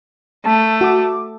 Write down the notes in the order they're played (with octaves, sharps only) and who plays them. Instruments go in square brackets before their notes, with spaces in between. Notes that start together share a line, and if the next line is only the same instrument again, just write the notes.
[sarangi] A3 [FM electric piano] A5
[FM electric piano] F#4 D6